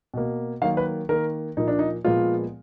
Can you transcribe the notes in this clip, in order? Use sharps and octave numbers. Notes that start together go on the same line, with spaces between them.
B2 A#3
D#3 F#3 A#3 F5
B4
D#3 A#3 A#4
A#2 F3 A#3 D#4
D4
D#4
A#2 F3 G#3 B3 F4